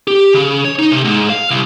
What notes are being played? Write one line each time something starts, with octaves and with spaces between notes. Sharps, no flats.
G4
C#3
C#5
D#4
C3
G#2
F5
C2